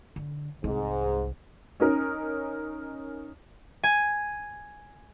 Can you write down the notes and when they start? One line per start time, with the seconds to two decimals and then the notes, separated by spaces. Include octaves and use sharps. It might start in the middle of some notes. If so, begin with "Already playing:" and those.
0.16 D3
0.64 C2 G#2
1.80 C#4 D#4 A#4
3.83 G#5